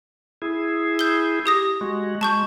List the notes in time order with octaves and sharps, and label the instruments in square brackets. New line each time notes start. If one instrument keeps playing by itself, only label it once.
[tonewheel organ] E4 G#4
[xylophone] G6 G7
G4 D#6 A#6
[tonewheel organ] G#3 F#4
[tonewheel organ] G#3 [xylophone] A5 C#6 G6